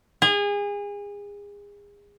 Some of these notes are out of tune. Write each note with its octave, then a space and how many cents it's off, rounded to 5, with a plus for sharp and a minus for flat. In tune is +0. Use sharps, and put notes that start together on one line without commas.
G#4 -30